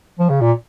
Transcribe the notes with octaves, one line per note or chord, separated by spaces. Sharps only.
F3
C#3
A#2